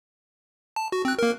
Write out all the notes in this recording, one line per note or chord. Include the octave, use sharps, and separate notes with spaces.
A5
F#4
C4 F#6
A#3 A#4